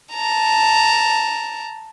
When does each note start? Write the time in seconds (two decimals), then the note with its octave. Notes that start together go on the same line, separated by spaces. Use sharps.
0.14 A5 A#5